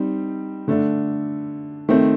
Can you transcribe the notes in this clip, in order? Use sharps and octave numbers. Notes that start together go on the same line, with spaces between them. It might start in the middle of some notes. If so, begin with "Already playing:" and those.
Already playing: G3 C4 D#4
D3 A3 D4
D#3 A3 C4